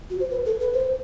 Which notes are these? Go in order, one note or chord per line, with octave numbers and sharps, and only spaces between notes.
F#4
C5
B4
A4
B4
C5